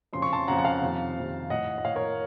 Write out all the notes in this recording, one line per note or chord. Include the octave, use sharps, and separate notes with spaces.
F2 C#3 C6
C#6
A5 C6
F2 C#3 F#5 A#5
F#5
F5 A5
F2 C3 D#3
F2 C3 D#3
A2 D#5 F#5
D#5
A2 C#5 F5
A#4 C#5